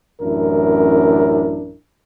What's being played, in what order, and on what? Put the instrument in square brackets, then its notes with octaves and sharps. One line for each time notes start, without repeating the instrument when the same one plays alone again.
[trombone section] A1 F#2 D4 E4 A#4